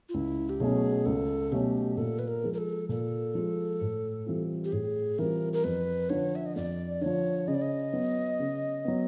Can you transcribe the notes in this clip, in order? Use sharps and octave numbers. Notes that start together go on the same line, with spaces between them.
F4
C#2 E4
G4
B2 F#3 A3 C#4 G#4
C#2 A4
B2 F#3 A3 C#4 G4
A#2 A4
B4
A#4
F3 G#3
A#4
A4
A#2 A4
F3 G#3
A2
E3 G3 C4 F4
G4
A2 G#4
E3 G3 C4 F4 A#4
A#4
F2 B4
D3 F3 C#5
E5
D#5
F2 D5
D3 F3 C#5
C#3 D#5
D5
D#5
F#3 B3
C#3
F#3 B3